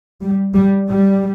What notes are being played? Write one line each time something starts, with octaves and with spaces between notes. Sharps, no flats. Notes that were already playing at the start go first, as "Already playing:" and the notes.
G3
G3
G3